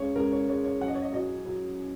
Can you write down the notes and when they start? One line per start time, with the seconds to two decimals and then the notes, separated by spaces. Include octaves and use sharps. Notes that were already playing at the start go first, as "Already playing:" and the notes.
Already playing: C#2 C#3 C#5
0.16 C#2 A#4
0.32 C#5
0.48 G#3 C#5
0.64 C#5
0.81 F#2 F#5
0.88 D#5
0.95 C#5
1.02 D#5
1.13 F#3 D#5
1.46 F#3